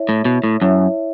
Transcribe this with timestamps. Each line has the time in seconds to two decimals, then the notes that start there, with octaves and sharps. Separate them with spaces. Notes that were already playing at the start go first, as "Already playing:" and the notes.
Already playing: E4 C#5 E5
0.09 A2
0.25 B2
0.44 A2
0.61 F#2 E4 C#5 E5